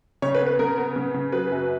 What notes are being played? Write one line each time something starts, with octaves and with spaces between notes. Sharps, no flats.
C#3 C#5
B4
B3
B4
C#3 A#4
B3
C#3
C#3
F#3 B4
F#2